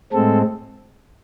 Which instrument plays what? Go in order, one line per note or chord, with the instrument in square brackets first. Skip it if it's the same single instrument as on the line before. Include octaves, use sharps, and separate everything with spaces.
[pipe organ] A2 G#3 C4 A4